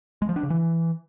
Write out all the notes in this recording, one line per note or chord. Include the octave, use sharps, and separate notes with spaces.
G#3
F3
D4
C#3
E3